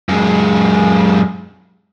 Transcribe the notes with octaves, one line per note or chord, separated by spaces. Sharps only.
F#2 G#3